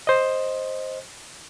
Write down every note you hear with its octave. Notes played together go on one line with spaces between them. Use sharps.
C5 D#5